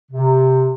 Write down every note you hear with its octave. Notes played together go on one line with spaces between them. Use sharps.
C3